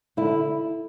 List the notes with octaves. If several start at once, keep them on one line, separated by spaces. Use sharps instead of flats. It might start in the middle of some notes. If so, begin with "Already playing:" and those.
D3 E4